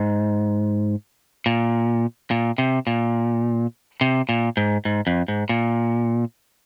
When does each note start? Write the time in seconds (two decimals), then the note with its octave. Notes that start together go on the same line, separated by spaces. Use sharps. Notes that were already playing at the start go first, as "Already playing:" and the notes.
Already playing: G#2
1.46 A#2
2.31 A#2
2.58 C3
2.87 A#2
4.01 C3
4.29 A#2
4.57 G#2
4.85 G#2
5.07 F2
5.28 G#2
5.49 A#2